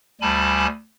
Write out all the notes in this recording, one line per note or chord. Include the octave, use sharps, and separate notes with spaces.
D2 G3 G#5 A5 B5